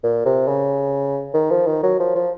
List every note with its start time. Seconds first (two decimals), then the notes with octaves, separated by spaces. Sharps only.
0.03 A#2
0.25 C3
0.47 C#3
1.34 D#3
1.51 F3
1.66 D#3
1.83 F#3
1.99 F3
2.15 F3